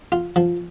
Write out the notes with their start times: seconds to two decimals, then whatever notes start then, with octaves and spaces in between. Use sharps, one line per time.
0.12 F4
0.36 F3